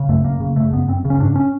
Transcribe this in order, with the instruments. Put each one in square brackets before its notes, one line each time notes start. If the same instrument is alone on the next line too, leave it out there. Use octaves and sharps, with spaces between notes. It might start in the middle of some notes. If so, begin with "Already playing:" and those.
Already playing: [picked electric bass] C#3
F#2 A3
F#2 A#3
C#3
C#3 A3
F#2 B3
F#2 C4
C#3
C#4
G#2 D4
C#4